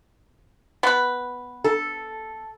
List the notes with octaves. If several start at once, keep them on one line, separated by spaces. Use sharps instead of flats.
B3 B4
A4